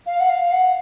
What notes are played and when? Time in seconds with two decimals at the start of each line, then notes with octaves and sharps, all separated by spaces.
0.06 F5
0.20 F#5
0.29 F5
0.51 F#5